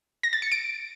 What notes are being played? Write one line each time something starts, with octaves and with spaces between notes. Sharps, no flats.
A#6
A6
C#7
D7